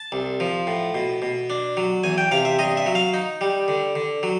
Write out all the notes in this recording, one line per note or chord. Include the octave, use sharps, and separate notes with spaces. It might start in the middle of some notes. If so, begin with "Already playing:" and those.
Already playing: A5
C2
F3
A2
B2
B2
D4
F#3
E2 G#5
G5
C3 F5
E5
G2 D#5
E5
F#3
F5
D#4
G3
D3
D3
F#3